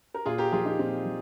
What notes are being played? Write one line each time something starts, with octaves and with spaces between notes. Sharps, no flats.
A#4
A#2 F4 G#4
G4 A#4
F3 F4 G#4
D#4 G4
A#2 C4 D#4
F3